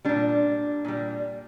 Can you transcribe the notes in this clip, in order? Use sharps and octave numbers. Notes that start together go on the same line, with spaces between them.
A#2 G3 D4
A#2 G3